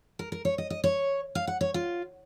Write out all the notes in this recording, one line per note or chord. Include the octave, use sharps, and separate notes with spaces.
A#4
A#4
C#5
D#5
D#5
C#5
F5
F#5
C#5
F4